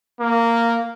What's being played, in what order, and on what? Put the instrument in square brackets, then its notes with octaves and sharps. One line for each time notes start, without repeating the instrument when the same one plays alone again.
[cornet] A#3